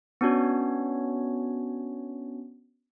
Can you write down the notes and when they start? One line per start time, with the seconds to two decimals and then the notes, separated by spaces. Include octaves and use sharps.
0.21 B3 C#4 D4 F#4 C#5